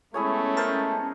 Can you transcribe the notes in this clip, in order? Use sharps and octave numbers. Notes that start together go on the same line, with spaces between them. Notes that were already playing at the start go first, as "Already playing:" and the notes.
G#3 A3 B3 C#4 E4 G#4 C#5
A#4 C5 A5